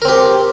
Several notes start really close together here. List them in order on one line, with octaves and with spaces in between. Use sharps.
A#4 C4 G4